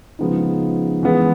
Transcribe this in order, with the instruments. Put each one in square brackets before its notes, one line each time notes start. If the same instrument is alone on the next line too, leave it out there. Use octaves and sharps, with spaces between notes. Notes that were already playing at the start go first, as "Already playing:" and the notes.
[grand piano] C#3 F3 G#3 B3 D#4
E3 G#3 B3